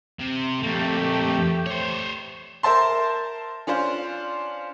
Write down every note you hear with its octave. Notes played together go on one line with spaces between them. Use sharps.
C3
F2 A3 A#3 G4
C5 C#5
A#4 C5 E5 A5 C6
C#4 D4 F4 C5